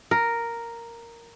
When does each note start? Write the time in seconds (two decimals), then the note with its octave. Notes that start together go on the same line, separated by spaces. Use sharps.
0.11 A#4